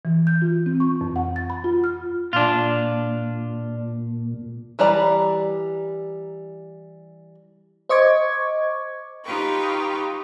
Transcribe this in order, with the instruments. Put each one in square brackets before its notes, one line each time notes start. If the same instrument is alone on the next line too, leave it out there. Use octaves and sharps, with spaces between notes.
[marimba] E3
G6
F4
C4
C#6
F2
F#5
A6
B5
F4
F6
[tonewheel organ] A#2 [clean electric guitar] D4 F4
[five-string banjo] E3 G3 D5 A#5
[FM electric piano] C5 D#5 C#6 D6 G#6
[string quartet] D#4 F4 G4 B4 G5 C#6